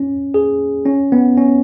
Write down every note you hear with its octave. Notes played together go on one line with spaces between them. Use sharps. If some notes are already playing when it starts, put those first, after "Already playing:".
Already playing: C#4
G#4
C#4
B3
C#4